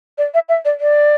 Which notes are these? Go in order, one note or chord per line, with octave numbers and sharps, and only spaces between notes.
D5
E5
E5
D5
D5